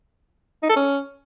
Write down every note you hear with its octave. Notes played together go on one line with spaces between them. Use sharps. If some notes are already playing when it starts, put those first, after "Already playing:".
D#4
A4
C#4